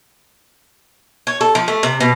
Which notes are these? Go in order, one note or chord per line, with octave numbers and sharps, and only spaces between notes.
C#5
A4
F3
A3
C3
B2